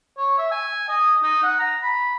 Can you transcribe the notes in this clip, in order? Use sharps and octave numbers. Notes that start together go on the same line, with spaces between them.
C#5
E5
G#5
D#5
D#4
F#5
A#5
B5